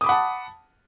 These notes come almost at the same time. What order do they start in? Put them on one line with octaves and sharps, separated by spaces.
D#6 D6 B5 F#5 A5